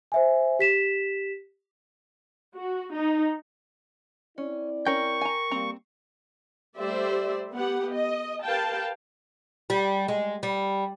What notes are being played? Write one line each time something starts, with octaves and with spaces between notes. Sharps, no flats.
C5 E5 G#5
G4 B6 E7
F#4
D#4
C4 C#4 E4 D5
C#4 A#4 G5 C#6
G#5 A#5
G3 A#3 C4 A#5
G3 A3 G4 C5 D5 E5
B3 G4 F#5
D#5
G4 A#4 B4 F5 G5 A5
G3
G#3
G3